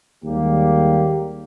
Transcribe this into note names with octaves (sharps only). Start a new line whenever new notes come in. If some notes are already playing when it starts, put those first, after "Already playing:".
D#2 G3 G#3 A#3 G4